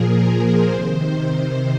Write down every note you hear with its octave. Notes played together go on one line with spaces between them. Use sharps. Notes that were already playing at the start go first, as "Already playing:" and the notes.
Already playing: A#2 F3 G#4 A#4
C5
C3 D#3